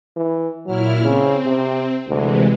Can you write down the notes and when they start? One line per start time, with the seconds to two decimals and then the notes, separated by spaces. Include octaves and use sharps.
0.17 E3
0.67 A#2 F#3 E4 F6
1.04 C#3 C4
1.46 C3
2.08 D2 C3 E3 G#3